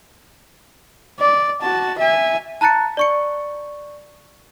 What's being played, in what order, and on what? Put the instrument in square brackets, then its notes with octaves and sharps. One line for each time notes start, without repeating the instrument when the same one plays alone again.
[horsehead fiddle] D5
F#4 A5
E5 G#5
[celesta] A5 A#5 F#6 A6 C#7
D5 C#6 C#7